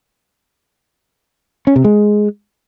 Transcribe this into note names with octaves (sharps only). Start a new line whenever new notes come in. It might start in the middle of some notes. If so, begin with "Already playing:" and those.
C#4
C3
G#3